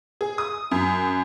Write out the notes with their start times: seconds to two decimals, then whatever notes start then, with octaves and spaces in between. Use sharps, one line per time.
0.21 G#4
0.38 D#6
0.71 F#2